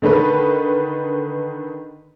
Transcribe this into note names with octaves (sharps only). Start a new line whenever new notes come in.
D3 D#3 A4 B4